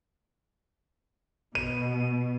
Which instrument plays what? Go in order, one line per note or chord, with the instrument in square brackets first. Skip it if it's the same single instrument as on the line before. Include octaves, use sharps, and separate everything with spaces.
[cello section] B2 [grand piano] D#7